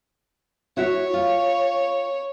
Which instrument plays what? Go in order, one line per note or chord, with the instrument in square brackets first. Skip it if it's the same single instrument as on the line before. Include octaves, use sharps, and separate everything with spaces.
[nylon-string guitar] E4 F#4 E5 [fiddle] C#5
[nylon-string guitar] F4